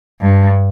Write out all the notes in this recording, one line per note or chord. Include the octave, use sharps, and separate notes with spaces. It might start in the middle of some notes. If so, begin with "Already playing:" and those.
G2